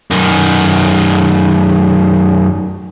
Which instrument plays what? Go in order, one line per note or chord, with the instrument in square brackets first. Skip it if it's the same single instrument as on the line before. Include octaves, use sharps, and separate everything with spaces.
[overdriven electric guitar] F#2 D#3